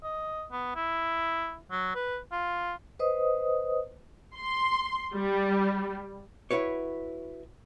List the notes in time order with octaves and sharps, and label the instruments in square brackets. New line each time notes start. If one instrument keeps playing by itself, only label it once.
[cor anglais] D#5
B3
E4
F#3
B4
F4
[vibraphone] B4 C5 D#5 D#6
[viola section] C6
G3
[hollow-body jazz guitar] E4 F#4 B4 C#5